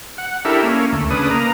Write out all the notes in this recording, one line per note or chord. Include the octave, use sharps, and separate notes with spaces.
F#5
D4 E4 G4 A4 A#4 E5
A#3 C#4
D2 A3
C#3 D4 B4 D#6
A#3 A#5